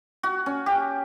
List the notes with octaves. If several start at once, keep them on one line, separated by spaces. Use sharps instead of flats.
F#4
C#4
G4